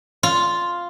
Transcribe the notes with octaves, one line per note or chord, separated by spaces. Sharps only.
F4